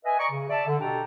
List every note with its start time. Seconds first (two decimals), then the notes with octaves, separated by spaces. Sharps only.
0.05 B4 D#5 E5 G#5
0.18 D5 D#5 A#5 C#6
0.31 C#3
0.50 D5 E5 A5
0.66 D3
0.79 B2 D4 G4 A4 G5 A#5